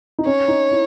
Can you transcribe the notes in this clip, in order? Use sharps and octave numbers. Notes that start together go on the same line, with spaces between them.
D#4
C#4 C#5
D#4
E4